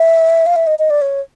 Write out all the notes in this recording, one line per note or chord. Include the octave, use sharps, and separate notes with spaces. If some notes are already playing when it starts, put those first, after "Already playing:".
Already playing: E5
F5
E5
D#5
D#5
D5
C#5